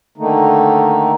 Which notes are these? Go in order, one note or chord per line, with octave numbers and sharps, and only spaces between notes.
D3 D#3 A3 A#3 D#4